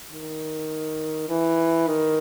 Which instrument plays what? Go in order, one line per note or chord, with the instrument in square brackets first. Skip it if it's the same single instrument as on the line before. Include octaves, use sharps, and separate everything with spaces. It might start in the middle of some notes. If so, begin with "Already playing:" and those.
[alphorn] D#3
E3
D#3